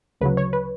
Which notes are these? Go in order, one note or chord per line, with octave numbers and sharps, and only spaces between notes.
D2 C#3 F#3 B4
C#5
B4